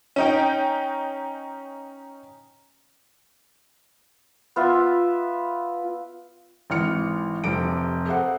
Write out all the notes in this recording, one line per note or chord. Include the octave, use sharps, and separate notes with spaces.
C#4 D#4 G5
B3 F4 E5
G#1 E3 F6 C#7
F1 C3 D7
G#4 A4 C5 E5 F#5